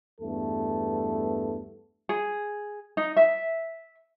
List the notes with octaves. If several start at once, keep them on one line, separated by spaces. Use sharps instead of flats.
E2 G2 A3 B3 A4
G#4
D#4
E5